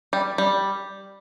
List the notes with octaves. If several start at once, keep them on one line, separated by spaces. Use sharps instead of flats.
G3
G3